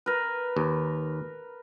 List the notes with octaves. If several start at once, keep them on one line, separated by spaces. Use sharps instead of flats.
A#4 B4
D#2